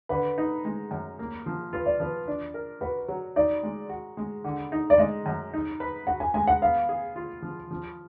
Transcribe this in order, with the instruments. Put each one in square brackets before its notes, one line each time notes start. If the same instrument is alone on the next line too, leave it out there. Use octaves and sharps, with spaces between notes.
[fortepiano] D3 [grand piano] B4
[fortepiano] D#4
G#3
F#2
A#3
F3
[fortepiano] F4 [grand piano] B4
[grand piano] D5
[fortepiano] F3 [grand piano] B4
[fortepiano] D4
A#4
[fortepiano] F#4 [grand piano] B4
[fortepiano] F#3
[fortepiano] D#4 [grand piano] D5
[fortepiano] G#3
F#4
G#3
D3
D#4
[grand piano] D5
[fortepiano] G#3 [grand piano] D#5
[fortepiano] F#2
D#4
B4
[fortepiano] F#4 [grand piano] F#5
[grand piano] G#5
[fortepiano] G#3 [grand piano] G#5
[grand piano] F#5
[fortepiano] B3 [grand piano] F5
[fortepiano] G#4
F4
F3
F3